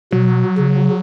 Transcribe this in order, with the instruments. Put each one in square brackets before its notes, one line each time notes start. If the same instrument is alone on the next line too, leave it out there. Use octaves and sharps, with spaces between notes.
[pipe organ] B2 [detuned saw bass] F#3
[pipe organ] C#3